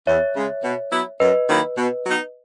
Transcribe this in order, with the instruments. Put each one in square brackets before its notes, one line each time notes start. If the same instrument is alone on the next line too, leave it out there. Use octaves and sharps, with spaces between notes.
[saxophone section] E2 [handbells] C#5 E5
[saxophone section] C#3 G#3
B2
F#3 B3 E4
[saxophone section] F#2 [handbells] B4 D#5
[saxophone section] D#3 F#3 A#3 E4
B2
F#3 B3 D#4